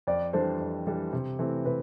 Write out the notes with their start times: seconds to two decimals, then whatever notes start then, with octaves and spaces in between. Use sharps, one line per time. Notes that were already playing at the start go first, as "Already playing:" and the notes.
0.07 F2 D5
0.33 E3 G3 D4 A4 C5
0.60 F2
0.87 E3 G3 D4 A4
1.13 C3
1.39 E3 A3 C4 E4
1.65 C3 B4